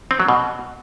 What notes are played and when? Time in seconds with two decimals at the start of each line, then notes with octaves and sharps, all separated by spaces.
0.11 C4
0.20 F#3
0.28 B2